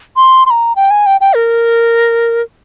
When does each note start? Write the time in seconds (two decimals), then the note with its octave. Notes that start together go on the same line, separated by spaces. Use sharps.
0.17 C6
0.46 C6
0.51 A#5
0.76 G5
0.91 G#5
1.06 G5
1.21 G5
1.35 A#4